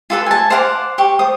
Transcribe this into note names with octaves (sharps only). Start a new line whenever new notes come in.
F4 A4 B4
G#5 A5
C5 F5 F#5 D6
G4 C#6
F4 C5 D#6